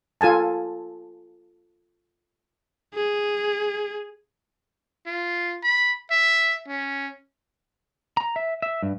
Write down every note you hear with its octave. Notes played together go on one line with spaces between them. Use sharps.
F4 A4 G#5 A5
G#4
F4
B5
E5
C#4
A#5
E5
E5
G2